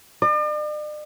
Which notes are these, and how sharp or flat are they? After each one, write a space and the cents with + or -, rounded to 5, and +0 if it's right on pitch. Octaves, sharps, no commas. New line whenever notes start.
D5 +45